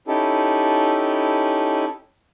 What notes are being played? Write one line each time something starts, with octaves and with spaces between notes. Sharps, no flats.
C#4 D#4 E4 G4 A4